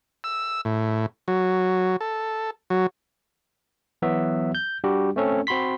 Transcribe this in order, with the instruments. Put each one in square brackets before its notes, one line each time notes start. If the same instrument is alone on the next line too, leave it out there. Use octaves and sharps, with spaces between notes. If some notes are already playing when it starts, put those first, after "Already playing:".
[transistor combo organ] E6
A2
F#3
A4
F#3
[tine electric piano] E3 F#3 B3 F#4 E5
G6
G3 D4 F#4 G4
A3 C4 C#4 A4
C4 F#4 B5 C6 B6